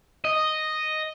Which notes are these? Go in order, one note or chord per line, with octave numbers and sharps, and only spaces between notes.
D#5